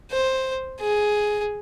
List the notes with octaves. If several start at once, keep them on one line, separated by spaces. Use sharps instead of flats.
C5
G#4